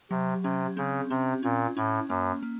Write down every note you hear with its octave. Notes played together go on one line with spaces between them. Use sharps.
C3 F#3
C3 C#4
C#3 C4
C3 C4
A#2 C#4
A2 C#4
F#2 A#3
A#3